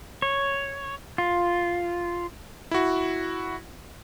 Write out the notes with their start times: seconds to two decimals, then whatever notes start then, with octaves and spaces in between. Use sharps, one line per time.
0.22 C#5
1.18 F4
2.71 E4 F#4